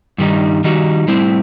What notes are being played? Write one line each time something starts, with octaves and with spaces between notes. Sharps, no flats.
G2 D#3 G3 D#4
D#3 G3 D#4 F#4
A2 G3 C4 E4